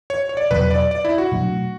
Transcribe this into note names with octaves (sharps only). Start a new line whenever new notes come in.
C#5
C#5
D5
E2 B2 F#3 B4
D5
D5
E4
F#4
B2 F#3 A3 D4